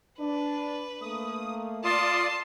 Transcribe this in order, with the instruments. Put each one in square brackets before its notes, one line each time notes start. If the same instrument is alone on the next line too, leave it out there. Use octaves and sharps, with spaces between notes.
[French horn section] D4 [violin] B4
[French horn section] A3 A#3 [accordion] D#6
[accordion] F4 D5 D#6 [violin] A5 C6